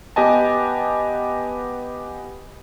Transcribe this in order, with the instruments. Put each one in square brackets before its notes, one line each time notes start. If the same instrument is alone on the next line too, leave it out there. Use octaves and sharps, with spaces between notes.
[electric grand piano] B3 G4 B4 D#5 G#5 A5